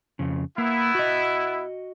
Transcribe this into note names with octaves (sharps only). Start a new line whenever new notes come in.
F2 C#3
A#3 B3 E4
F#4 D#5